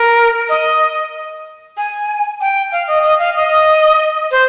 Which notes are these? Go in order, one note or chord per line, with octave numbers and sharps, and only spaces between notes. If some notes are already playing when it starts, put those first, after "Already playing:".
Already playing: A#4
D#5
G#5
G5
F5
D#5
D#5
F5
D#5
C5